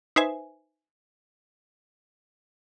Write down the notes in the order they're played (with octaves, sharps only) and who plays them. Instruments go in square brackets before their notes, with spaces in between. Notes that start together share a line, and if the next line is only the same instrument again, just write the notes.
[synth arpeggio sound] D#4 B4 C5 E5 G#5